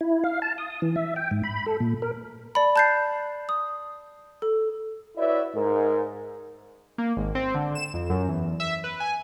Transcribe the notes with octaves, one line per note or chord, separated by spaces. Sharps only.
E4
F5
A5
D#6
E3
E5
G5
G#2
B5
A4
A#2
A#4
D5 A5 B5
A5 F#6 G6 A6 C7
D#6
A4
E4 F#4 B4 C#5 D5 E5
G#2 A#4
A#3
G#1
C4
D3
E7
F2
F#2
E2
E5
B4
G#5